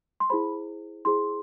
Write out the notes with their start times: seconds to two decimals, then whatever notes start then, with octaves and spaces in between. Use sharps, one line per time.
0.20 C6
0.30 E4 G#4 C5 B5
1.05 E4 G#4 C5 C6